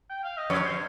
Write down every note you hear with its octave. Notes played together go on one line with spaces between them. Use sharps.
G5
F5
D#5
F2 C#5
C5